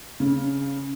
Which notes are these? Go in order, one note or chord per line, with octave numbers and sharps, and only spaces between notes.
C#3